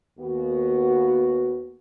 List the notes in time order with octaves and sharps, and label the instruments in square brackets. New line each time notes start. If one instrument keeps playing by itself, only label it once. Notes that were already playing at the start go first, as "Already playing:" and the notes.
[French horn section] D#2 B3 F#4